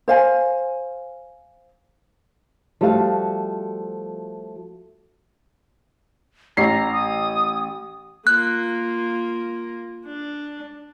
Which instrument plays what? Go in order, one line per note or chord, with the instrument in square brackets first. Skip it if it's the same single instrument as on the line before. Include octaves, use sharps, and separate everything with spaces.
[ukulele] C5 F5 G#5
[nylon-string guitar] F3 G3 A3 F#4 F5
[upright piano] A1 C7 [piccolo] A#5
[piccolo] D#6
[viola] A#3 F4 [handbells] F#6
[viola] D4